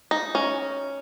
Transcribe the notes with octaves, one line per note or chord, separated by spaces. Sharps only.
D#4
C#4